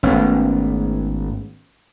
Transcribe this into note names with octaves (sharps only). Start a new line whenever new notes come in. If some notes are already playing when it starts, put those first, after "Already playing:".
G#1 A3 B3 C#4